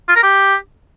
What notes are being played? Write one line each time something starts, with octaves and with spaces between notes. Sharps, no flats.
F4
A#4
G4